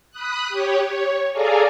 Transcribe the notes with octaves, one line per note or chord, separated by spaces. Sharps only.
B5 D#6 F#6
G4 C#5
C#5
G#4 A4 D5 F5 G#5 A#5